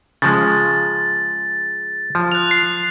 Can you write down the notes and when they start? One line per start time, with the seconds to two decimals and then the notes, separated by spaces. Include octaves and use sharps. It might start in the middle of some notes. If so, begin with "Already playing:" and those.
0.22 C#3 F3 G#3 A6
2.15 F3
2.32 F#6 F7
2.51 C7